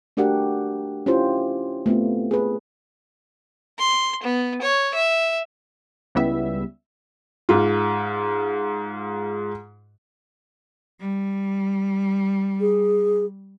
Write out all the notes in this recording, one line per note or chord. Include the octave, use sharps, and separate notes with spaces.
A3 D4 F#4 G4 A#4 F#5
C#4 E4 F4 G4 C5
A3 B3 C4 F4
G#4 B4
C6
B3
C#5
E5
C#2 C#3 G3 B3 E4 E5
G#2 F4
G3
G#4